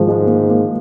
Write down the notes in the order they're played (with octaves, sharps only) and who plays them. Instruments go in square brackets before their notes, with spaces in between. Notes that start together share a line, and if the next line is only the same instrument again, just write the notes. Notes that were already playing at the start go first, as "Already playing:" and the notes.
Already playing: [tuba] G#2 [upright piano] D#3 F3
[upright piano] G#3
A#3
A#3